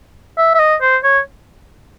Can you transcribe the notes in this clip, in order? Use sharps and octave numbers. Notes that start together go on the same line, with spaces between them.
E5
E5
D#5
C5
C#5